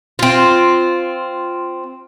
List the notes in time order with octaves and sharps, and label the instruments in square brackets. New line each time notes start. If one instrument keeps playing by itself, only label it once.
[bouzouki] C4 F4